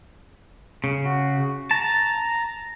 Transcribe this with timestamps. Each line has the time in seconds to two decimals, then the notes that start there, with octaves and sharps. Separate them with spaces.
0.84 C#3
1.04 F#4
1.71 A5 A#5